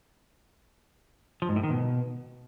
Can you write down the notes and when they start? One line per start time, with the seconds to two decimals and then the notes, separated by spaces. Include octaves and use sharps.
1.42 F3
1.49 G#2
1.56 A2
1.63 D#3
1.71 B2